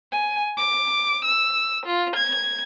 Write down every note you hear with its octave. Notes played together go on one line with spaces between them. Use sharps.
G#5
D6
E6
F4
G#6